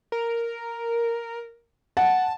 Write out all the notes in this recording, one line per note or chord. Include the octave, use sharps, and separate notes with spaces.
A#4
F#5 A5